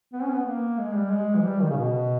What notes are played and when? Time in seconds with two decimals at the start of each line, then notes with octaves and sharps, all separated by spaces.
0.13 B3
0.23 C#4
0.32 B3
0.45 A#3
0.78 G#3
0.95 G3
1.11 G#3
1.36 E3
1.44 G3
1.61 D#3
1.70 C#3
1.77 B2